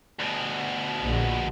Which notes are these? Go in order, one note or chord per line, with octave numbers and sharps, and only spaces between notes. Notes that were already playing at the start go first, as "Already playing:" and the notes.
D2 B2
A#1